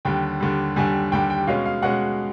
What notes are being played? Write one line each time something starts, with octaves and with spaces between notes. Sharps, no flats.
D#2 D3 G3 G5
D#2 D3 G3
D#2 D3 G3 G#5
D#2 D3 G3 G5
G5
B2 G#3 C#4 F5
F5
B2 G#3 C#4 F#5